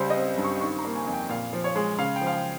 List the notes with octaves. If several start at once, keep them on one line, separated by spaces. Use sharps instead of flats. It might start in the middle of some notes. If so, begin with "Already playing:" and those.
Already playing: C#2 G3 C5
C4 D#5
G2
C#6
D#3 C#6
A#5
A#3
G#5
F2 G#5
G5
A#2 F5
F3
C#5
G#3
C#3 F5
G5
F3
F5
G5